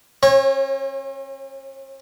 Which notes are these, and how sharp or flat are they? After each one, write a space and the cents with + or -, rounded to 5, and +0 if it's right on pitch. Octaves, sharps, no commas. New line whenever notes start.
C#4 -45 C#5 -20